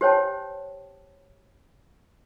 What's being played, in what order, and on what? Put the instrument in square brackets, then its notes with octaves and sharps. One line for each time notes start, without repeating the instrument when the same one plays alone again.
[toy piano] G4 C5 C#5 G5 A5